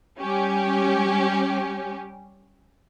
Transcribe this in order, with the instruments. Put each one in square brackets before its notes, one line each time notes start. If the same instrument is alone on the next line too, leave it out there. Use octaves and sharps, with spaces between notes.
[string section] G3 C#4 G4